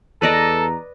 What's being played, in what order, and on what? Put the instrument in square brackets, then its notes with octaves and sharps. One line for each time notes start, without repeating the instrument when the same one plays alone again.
[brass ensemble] E2 A#5 [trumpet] A4 [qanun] B4 D5 D#5